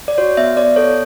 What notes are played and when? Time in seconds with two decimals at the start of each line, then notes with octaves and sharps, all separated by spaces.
0.08 D5
0.18 F#4 C#5
0.37 B3 E5
0.57 B3 D5
0.76 A4 C#5